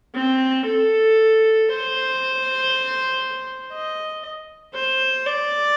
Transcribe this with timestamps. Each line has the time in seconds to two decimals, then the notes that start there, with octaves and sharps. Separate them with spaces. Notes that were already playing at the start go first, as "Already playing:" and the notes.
0.15 C4
0.65 A4
1.69 C5
3.73 D#5
4.74 C5
5.26 D5